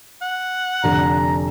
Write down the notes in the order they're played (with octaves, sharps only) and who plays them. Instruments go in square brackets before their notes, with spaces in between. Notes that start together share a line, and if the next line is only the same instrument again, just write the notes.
[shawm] F#5
[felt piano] F1 D3 [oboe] A#5